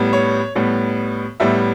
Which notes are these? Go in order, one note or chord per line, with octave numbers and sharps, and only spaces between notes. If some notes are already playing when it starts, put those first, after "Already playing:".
Already playing: A2 G3 B3
C#5
A2 G3 B3
A2 G3 B3 E5